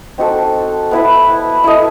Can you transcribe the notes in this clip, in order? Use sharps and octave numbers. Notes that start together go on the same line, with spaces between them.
C4 D#4 F#4 A4
B3 E4 B4
E4 A4 D#5